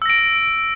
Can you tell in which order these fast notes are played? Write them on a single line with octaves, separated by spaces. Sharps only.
E6 A#6 D7